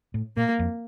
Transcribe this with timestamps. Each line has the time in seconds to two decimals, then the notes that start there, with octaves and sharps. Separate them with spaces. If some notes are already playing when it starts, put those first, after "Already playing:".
0.14 A2
0.37 A#2 A#3
0.59 F2